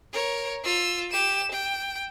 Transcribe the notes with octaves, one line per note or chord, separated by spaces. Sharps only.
A#4 C#5
F4 E6
G4 E7
G5